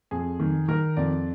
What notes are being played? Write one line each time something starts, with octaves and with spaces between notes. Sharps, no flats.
F2 G#4
D#3
D#3 A#4
F2 D5